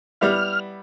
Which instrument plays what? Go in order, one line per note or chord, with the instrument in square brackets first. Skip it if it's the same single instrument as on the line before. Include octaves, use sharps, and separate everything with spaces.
[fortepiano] G3 B3 E4 [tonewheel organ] F6